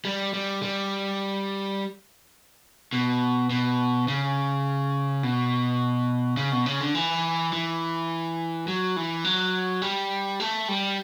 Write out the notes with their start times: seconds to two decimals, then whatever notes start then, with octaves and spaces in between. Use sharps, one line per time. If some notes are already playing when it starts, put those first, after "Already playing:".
0.05 G3
0.34 G3
0.63 G3
2.93 B2
3.50 B2
4.08 C#3
5.23 B2
6.37 C#3
6.52 B2
6.66 C#3
6.81 D3
6.95 E3
7.53 E3
8.68 F#3
8.96 E3
9.25 F#3
9.82 G3
10.40 A3
10.69 G3